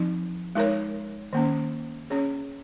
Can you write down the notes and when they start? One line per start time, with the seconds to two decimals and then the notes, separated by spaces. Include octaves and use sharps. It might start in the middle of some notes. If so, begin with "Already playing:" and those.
Already playing: F3 C4 D#4
0.55 G#3 D#4 A#4 C#5
1.33 D#3 A#3 C#4
2.10 C#4 G#4 C#5